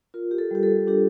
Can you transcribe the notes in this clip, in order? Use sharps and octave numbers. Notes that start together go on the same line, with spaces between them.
F4 A#4
G4
A4
G3 G4
A4
D4 G4